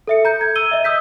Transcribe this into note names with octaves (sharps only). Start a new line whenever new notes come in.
A4 E5 C#7
A#5 G6
G#6
E6 D#7 G7
D#5 E5
D#6 E6 G6 B6